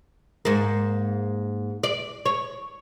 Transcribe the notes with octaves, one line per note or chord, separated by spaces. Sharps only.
G#2 A#3
D5
C#5